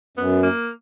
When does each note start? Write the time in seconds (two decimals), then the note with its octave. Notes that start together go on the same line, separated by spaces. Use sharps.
0.17 F#2 B3
0.43 A#3